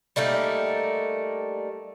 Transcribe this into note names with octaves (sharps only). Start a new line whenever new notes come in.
G3 A3 A#3 D#4